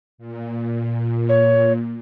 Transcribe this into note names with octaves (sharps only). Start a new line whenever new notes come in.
A#2
C#5